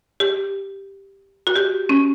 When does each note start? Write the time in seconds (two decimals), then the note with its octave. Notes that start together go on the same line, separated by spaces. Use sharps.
0.20 G4
1.47 F#4
1.56 G4
1.89 C#4